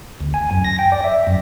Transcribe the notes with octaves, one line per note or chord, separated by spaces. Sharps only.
D2
G#5
F#2
A#6
G5
D5
E5
F#2